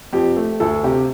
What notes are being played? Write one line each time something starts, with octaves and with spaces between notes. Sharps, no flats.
F2 G4
A3
D2 A4
C3 G4